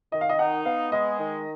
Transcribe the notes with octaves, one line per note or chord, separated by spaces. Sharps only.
D#3 D#5
F5
D#5
D#4 F#5
B3 F5
G#3 D#5
D#3